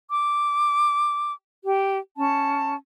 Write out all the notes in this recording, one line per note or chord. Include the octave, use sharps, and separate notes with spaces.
D6
G4
C#4 A5